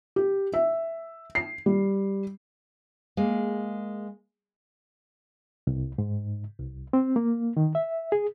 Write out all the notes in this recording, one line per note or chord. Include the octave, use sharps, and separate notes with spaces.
G4
E5
C7
G3
G#3 A#3
C2
G#2
C2
C4
A#3
D#3
E5
G#4